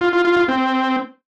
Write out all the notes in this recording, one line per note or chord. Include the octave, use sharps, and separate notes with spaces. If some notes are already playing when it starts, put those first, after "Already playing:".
F4
F4
F4
F4
C4